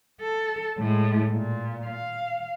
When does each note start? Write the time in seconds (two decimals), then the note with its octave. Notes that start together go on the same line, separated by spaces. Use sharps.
0.21 A4
0.78 A2 G#3
1.34 A#2
1.87 F5